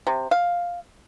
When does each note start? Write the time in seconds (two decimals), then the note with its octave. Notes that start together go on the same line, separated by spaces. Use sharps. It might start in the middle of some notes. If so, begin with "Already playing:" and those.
0.07 C3
0.31 F5